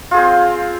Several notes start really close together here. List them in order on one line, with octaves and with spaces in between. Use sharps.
F4 G#4 C4